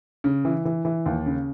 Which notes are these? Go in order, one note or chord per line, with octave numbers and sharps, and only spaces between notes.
C#3
E3
E3
E3
D#2
C#3